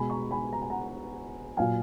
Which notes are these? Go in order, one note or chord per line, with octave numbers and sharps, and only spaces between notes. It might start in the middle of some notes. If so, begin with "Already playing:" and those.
Already playing: B2 G#3 G#5 B5
A#5 C#6
G#5 B5
A#5
G#5
F#5 A#5
A#2 F#3 F5 G#5